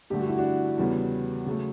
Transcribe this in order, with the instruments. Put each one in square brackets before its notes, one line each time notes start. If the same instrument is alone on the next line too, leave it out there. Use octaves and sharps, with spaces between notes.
[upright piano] G2 D3 A3 G4
F#4
E4
D4 F#4
E2 C#3 G3 B3
C#3 F#3 A3